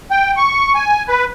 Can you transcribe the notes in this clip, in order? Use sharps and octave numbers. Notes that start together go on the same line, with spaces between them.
G5
C#6
G#5
B4